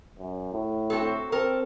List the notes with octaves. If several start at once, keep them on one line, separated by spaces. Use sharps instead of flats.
F#2
A2
C4 F#4 A4
C4 A4 A#4